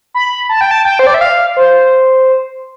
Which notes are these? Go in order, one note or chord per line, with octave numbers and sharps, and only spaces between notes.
B5
A5
G5
A5
G5
C5
D5
E5
F5
C5